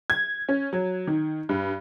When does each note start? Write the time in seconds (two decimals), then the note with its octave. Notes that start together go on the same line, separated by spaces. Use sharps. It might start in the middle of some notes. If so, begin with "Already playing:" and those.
0.10 G#6
0.49 C#4
0.73 F#3
1.07 D#3
1.49 G2